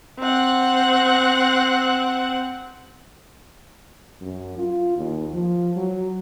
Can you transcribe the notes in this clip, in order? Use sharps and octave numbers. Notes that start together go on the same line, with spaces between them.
C4 F#5
F#2
F4
D#2
F3
F#3